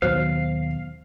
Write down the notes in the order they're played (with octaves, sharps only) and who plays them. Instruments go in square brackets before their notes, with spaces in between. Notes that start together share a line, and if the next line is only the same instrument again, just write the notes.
[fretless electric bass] D#2 B2 D#3 [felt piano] F#3 [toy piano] C5 [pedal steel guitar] F5